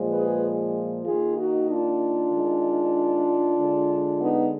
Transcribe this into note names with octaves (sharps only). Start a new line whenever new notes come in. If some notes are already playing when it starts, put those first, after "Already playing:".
Already playing: A#2 F3 G#3
G#4 B4
D#3 A#3 F4 G#4
D#4 F#4
D4 F4
D#3 G#3
D3 G#3
B3 D#4